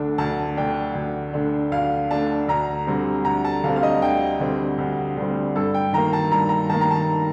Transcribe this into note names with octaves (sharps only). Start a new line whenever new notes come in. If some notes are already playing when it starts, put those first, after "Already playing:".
Already playing: D2 D3 A3 D4
D2 A5
D3 A3 D4 G5
D2
D3 A3 D4
D2 F5
D3 A3 D4 A5
D2 A#5
D3 G3 C4
D2 A#5
A5
D3 G3 C4 F5
F5
D#5
D2 G5
D3 G3 C4
D2
D3 G3 C4
G2 A4
G5
D#3 A#3 A#5
A5
G2 A#5
A#5
D#3 A#3 A5
A#5
A5